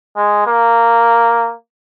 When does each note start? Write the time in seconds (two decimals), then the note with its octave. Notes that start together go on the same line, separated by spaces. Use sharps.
0.17 G#3
0.47 A#3